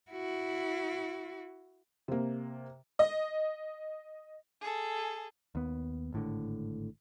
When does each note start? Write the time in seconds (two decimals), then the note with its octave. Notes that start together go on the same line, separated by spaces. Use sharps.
0.11 E4 F#4
2.08 C3 A#3
2.99 D#5
4.61 G#4 A4
5.55 D#2 B3
6.13 G#1 A2 D3